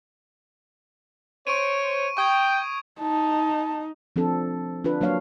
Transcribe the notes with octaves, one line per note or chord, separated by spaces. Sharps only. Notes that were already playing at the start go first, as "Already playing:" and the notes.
C5 C#5 C#6 D7 D#7
G5 C#6 D#6 G#6
D#4 A5
F3 C4 D4 A4
D4 F4 B4
F#3 A#3 D4 C#5 F5